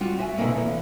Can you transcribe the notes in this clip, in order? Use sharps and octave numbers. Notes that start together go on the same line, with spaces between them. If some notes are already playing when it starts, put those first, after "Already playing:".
G3 F4 F#4
F#4 E5 G#5
B2 D3 D#3 A#3 E4
E2